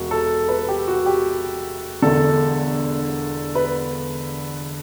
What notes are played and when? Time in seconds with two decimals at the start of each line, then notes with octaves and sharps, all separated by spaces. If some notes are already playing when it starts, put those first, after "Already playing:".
Already playing: E1 F#4
0.11 A4
0.49 B4
0.68 G4
0.88 F#4
1.06 G4
2.02 E1 E2 D3 A4
3.55 B4